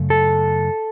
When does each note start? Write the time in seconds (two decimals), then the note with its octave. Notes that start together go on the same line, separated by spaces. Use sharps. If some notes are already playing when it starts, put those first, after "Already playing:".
Already playing: F#2 C#3 A3
0.10 A4